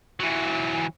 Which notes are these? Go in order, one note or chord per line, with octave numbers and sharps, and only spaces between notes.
E3 F#3